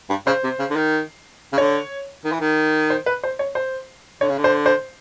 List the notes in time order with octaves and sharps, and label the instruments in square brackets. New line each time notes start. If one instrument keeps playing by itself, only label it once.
[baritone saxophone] G2
[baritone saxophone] C#3 [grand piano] C5
[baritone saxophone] C3
C#3
D3
D#3
C#3
[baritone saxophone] D3 [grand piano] C#5
[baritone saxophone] D#3
E3
D#3
[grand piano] C5
B4
C5
C#5
C5
[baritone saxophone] D3 [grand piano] C#5
[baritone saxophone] C#3
D3
[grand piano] C5
C5